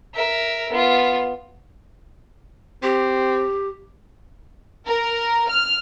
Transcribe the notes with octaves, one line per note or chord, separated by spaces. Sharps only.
A#4 E5
B3 F4
C4 G4
A#4
F6